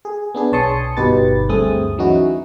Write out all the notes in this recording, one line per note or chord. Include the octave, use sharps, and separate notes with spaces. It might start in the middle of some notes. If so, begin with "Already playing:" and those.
G#4
B3 D4 G#4
B1 C#5 A5 C6 D#6 C#7
G1 B2 D#4 G4 B4 A6
D2 G2 A3 C4 G#4 D#6
E3 F#3 C#4 D#4 E4 F#4